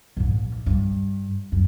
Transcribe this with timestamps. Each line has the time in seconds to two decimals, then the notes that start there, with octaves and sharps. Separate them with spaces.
0.17 A#1 G#2
0.66 G2
1.52 F#2